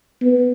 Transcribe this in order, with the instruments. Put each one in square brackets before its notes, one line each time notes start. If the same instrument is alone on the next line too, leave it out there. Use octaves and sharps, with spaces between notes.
[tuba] B3